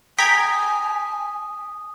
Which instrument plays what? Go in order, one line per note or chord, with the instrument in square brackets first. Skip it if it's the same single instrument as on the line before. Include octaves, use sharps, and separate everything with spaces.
[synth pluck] G5 A#5 G#6 [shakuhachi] G#5 [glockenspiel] D#6 [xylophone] B6